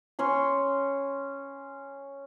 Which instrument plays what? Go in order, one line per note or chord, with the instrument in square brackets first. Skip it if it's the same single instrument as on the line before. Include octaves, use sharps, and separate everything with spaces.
[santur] C#4 C#5 C6